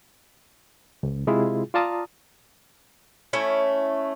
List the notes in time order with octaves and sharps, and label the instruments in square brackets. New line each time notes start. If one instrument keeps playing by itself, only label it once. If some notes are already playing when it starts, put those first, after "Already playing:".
[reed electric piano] C#2
C3 G#3 E4 F4 G#4
F4 D5 F5 A5 A#5 D#6
[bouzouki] A3 C#4 E4